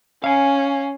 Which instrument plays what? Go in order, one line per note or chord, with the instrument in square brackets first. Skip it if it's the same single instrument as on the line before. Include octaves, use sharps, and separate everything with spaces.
[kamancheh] C#4 [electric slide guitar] F5 G#5